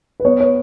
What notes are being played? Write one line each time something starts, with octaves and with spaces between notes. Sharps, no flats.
B4
B3 C#5
C#5